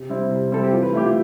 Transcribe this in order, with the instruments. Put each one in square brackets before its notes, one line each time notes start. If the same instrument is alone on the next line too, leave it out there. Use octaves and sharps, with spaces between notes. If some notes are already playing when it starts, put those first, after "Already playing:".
Already playing: [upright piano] C3
G3 C4 E4
C3
[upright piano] G3 C4 E4 [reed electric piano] A4
[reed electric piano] G4
[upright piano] E3 [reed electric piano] F4
[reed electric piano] B4
[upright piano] A3 E4 G4
[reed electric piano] F4